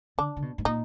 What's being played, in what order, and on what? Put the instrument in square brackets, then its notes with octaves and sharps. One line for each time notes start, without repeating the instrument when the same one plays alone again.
[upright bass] D3 [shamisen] D4
[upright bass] D3
B2
G#2
[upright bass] A#2 [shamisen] D#4